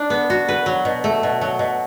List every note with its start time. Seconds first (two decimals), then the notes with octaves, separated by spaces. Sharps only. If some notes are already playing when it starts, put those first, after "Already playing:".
Already playing: D4
0.10 B3
0.30 F#4
0.48 B4
0.66 F#3
0.85 B2
1.04 A3
1.23 B2
1.41 F#3
1.59 B2